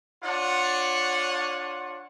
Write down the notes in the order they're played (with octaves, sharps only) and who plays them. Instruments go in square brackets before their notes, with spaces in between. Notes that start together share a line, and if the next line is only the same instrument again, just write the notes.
[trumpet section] D4 F4 C#5 F#5